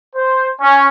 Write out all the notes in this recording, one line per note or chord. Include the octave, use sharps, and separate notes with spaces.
C5
C#4